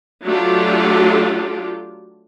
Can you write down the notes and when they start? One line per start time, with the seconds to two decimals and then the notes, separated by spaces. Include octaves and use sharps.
0.25 F#3 A3 D4 F4 G4